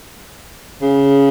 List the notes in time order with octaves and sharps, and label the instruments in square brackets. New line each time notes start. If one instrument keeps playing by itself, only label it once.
[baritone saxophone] C#3